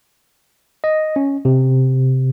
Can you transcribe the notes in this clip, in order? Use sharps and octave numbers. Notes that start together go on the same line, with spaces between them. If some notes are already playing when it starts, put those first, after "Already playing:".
D#5
C#4
C3